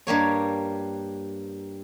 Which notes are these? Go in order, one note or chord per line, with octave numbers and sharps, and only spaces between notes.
G2 G3 A#3 C#5